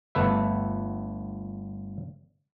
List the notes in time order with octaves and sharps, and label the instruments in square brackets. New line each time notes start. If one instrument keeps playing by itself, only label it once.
[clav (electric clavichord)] G1 A3 B4 E5